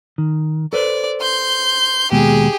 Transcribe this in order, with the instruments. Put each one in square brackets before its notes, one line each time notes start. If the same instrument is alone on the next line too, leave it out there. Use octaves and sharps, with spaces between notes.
[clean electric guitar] D#3
[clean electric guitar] A4 B4 C5 [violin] D5
[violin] C6 G6
[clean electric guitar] D#2 B2 G#3 [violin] G4 G#4